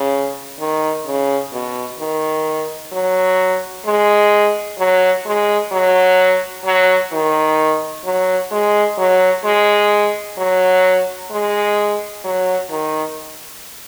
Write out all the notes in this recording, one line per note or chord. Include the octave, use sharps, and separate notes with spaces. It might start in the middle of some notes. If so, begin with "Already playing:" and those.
Already playing: C#3
D#3
C#3
B2
D#3
F#3
G#3
F#3
G#3
F#3
F#3
D#3
F#3
G#3
F#3
G#3
F#3
G#3
F#3
D#3